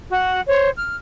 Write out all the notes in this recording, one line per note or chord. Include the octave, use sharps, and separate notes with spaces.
F#4
C5 C#5
F6